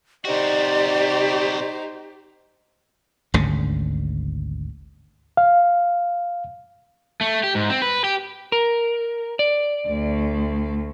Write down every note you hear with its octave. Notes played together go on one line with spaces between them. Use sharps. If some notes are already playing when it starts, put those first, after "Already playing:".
C3 D#4 F#4 G4 C5 D5
G#1 D2 C#3
F5
A3
G4
G#2
C4
B4
G4
A#4
D5
D2